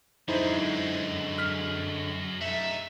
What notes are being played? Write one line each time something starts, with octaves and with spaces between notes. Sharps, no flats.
F#2 D3 G#3 D#4 E4 C5
F6 B6
A3 D#4 E5